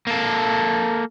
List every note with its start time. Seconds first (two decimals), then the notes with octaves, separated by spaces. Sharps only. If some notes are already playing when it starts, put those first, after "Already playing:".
0.07 A#3 A4